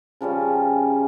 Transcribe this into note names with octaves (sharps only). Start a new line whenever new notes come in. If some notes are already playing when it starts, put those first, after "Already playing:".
C#3 F3 G3 C#4